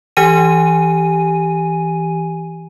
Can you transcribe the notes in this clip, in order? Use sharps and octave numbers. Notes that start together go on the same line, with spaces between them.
E3 G4 G#5 D#7